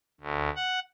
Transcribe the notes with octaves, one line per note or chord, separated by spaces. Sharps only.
D2
F#5